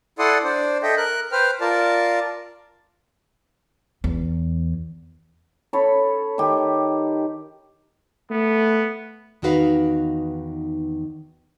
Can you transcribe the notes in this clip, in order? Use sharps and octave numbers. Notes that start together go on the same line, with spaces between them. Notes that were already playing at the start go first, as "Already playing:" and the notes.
E4 A4 D5 F#5 C6 D#6
D4 C5 D5
A4 D#5 E5 G5
A#4 F#6
B4 C5 G5 F6
F4 A#4 D5 A5
E2
A4 C#5 B5
D#3 G4
A3 B3
E2 D#3 D#4 F#4 B4 F5